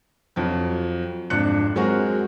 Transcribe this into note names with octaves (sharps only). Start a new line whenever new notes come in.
F2 F#3
G#1 F2 D4 F#6 C#7
F#3 G#3 C4 F#4 A#4